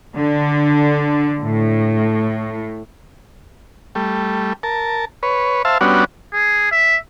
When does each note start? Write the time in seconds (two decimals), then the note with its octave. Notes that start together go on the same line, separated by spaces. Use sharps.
0.18 D3
1.42 A2
3.95 G3 A3
4.63 A#4 A5
5.23 B4 C#5
5.65 C5 E5 F5 A5
5.81 G3 B3 C#4 D4 F#4
6.34 G#4
6.72 E5